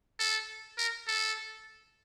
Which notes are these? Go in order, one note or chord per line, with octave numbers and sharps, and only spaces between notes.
A4
A#4
A4